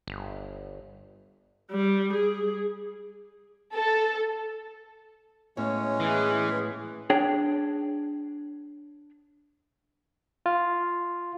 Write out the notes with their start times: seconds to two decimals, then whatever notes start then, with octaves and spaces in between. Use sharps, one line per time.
0.07 G1
1.71 G3
2.14 G#4
3.74 A4
5.57 A2 G#3 B3 C#4 C#5
6.00 E3 G#4
7.10 D4 G#4 C#5 G5
10.46 F4